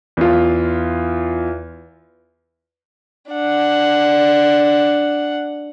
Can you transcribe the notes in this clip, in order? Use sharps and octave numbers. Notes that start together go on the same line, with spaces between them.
E2 F4
D4 F#5